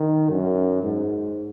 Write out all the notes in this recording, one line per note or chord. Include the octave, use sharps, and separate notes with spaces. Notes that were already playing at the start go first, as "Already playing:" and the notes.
Already playing: D#3
F#2
G#2